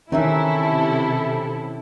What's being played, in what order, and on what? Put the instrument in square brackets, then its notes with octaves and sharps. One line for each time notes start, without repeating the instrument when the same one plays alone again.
[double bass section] C3 [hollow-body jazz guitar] D#3 E3 [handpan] C#4 E5 [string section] E4 A4